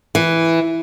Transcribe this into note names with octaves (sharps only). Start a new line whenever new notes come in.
E3